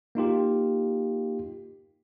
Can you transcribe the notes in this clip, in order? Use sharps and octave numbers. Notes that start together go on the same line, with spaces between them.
A#3 D#4 F4 G4